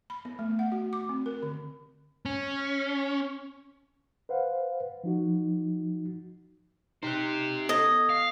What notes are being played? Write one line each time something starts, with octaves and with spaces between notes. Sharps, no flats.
B5
B3
A3
F#5
F#4
D6
C4
A#4
D3
C#4
B4 C5 F5 F#5
F3 D#4 F#4
D#4 G4 C5 F#6
B3 A4 D#5 G#6
F5